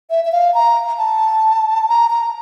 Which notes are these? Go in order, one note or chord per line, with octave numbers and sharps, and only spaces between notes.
E5
E5
F5
A#5
A5
A#5
A#5